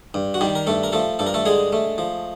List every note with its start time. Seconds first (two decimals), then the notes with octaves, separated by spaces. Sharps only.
0.14 G2
0.34 F#4
0.41 D#3 G3 G4
0.55 A#4
0.67 G2 A3 A4
0.83 A#4
0.92 F3 A3 A4
1.19 G2 A4
1.26 A#4
1.34 A3 A4
1.46 D3 G#3 G#4
1.73 A3
1.98 F3